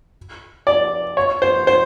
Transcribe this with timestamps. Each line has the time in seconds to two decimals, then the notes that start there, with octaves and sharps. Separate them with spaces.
0.67 D5
1.17 C#5
1.42 C5
1.67 C5